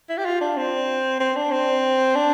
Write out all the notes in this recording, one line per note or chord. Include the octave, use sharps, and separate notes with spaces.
E4
G4
F4
D4
C4
C4
D4
C4
D4